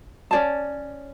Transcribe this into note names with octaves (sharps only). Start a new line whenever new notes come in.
C#4 G#4 D5 A5